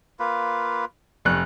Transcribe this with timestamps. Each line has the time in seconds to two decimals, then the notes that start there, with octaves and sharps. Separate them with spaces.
0.19 A#3 F4 B4
1.25 F1 C#6 F#6